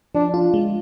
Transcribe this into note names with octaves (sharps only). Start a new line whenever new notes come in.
F3 D4
F4
G#3